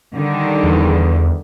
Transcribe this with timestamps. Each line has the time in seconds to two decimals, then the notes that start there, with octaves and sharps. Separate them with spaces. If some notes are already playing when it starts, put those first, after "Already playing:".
0.16 D3 D#3 G3
0.63 E2